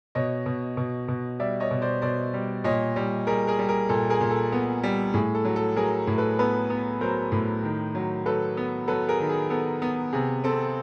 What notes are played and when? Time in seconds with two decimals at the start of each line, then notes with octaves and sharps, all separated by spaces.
0.15 B2 C#5 D#5
0.46 B2
0.77 B2
1.08 B2
1.39 G3 D5 E5
1.60 C#5 D#5
1.71 B2
1.82 C5 D5
2.02 B2 C5 D5
2.33 G3
2.64 A#2 C#5 D#5
2.96 G3
3.27 G3 G#4 A#4
3.47 G#4 A#4
3.59 G3
3.68 G#4 A#4
3.89 A#2 A4
4.10 G#4 A#4
4.21 A#2
4.31 A4
4.52 B3
4.83 G3
5.14 A2 G#4
5.35 A4
5.45 F#3
5.56 A4
5.76 F#3 G#4 A#4
6.07 A2
6.18 A4 B4
6.39 B3 A4 B4
6.70 B3
7.01 F#3 A#4 C5
7.32 A2
7.63 D#3
7.95 F#3
8.26 F#3 A4 B4
8.57 B3
8.88 F#3 A4 B4
9.08 G#4 A#4
9.20 D#3
9.29 G#4
9.50 B3 A4
9.82 B3
10.13 C3 G#4
10.44 C4 A4